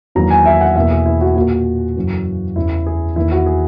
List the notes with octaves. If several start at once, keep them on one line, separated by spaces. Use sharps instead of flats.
E2 D#3 F#3 A#3 A#5
G#5
E5
F#5
E2 B2 A#3 E5
G#4
E4
F#4
A#2 A#3 F#4
F#2 C#3 E3
E2 C#3 E3 E4
G#4
E2 D#3 A#3 E4
F#4
G#4